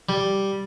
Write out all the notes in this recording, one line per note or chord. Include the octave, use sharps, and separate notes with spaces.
G3